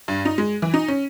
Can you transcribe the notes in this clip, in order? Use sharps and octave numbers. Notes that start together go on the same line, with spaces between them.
G2
D#4
G#3
E3
D#4
C#4